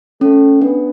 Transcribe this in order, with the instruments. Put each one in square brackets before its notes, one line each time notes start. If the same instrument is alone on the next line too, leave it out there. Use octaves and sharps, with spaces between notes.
[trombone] A3 [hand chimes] C#4
[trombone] B3 [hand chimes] D4